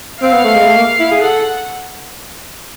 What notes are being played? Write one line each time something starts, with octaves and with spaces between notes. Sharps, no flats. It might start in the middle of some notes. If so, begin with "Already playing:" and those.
C4 F5
B3
A3
G#3
A3
A#3
E4
G#4
A4 F#5